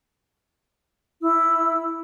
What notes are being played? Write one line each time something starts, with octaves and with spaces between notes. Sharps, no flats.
E4 E6